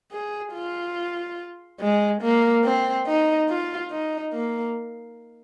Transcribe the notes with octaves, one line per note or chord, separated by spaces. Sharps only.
G#4
F4
G#3
A#3
C4
D#4
F4
D#4
A#3